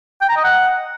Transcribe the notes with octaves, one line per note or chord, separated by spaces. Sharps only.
G5
A#5
D#5
F#5